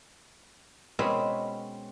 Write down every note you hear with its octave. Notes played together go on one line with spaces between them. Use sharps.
B2 G#3 C4 C#4 B4